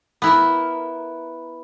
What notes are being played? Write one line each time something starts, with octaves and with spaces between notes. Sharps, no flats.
B3 E4 A#4